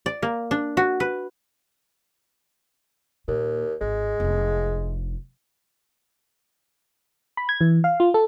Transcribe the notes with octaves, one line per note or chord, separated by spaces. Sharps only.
D5
A#3
D4
F#4
B4
D#2 A#2
G#1 G#3
F1 D4
B5
G#6
E3
F5
F4
A4